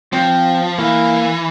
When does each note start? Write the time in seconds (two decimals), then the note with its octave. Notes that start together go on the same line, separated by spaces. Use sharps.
0.13 F3 C4
0.78 E3 A#3